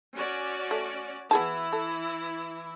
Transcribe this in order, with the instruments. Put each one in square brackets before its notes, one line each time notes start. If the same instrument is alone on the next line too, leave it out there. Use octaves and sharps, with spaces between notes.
[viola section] C#4 F#4 D5
[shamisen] A3
[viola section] E3 E4 [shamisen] B3 G#4 A5
[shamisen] A4